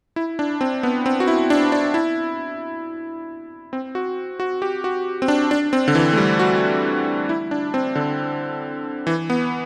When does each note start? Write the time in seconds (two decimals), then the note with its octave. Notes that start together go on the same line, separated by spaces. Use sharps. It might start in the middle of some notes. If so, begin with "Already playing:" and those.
0.16 E4
0.39 D4
0.61 C4
0.83 B3
1.06 C4
1.20 F#4
1.28 E4
1.50 D4
1.72 D4
1.94 E4
3.73 C4
3.95 F#4
4.40 F#4
4.62 G4
4.84 F#4
5.22 C4
5.28 D4
5.51 D4
5.73 C4
5.88 D3
5.95 E3
6.13 A3
6.17 G3
6.39 F#4
7.29 E4
7.51 D4
7.74 C4
7.95 D3
9.07 E3
9.30 B3